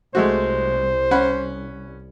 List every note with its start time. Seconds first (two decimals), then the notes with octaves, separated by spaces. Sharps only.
0.15 C2 G#3 A3 F#4 C5
1.11 C#4 F#5 B5